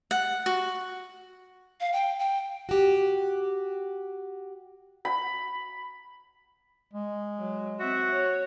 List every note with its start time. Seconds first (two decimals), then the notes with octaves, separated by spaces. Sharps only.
0.11 F#5
0.46 F#4
1.81 F5
1.93 G5
2.20 G5
2.69 F#4 G4
5.05 B5
6.93 G#3
7.39 F#3
7.80 C4 F#4 E5
8.12 C#5